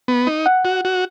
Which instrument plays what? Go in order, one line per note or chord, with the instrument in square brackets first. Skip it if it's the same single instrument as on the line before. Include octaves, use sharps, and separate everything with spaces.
[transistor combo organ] B3
D#4
[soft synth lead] F#5
[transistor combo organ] F#4
F#4